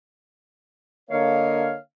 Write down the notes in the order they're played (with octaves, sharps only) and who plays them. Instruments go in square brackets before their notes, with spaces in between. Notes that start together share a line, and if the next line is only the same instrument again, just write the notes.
[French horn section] D3 A#3 D#5 [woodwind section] C#5 F5